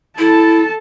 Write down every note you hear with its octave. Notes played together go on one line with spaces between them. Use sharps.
E4 A4 A5